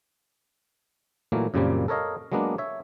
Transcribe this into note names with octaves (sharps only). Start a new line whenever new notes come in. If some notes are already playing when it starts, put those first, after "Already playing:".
A#2 E3 F#3 A3 A#3
F#2 A#2 C#3 G3 A#3 C4
A4 A#4 C#5 D#5 F5
F#3 G#3 A#3 B3 D4
C#5 E5